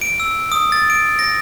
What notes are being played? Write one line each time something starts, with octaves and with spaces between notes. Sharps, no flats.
D7
E6
D#6
A6
D7
A#6